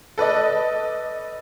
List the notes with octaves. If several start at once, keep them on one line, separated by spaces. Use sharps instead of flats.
A4 B4 D5 D#5